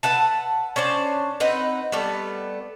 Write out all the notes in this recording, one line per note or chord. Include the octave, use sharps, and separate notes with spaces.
B4 E5 F#5 A5
C#4 D4 C5 D5
C4 D#4 B4 F#5
G3 A3 B3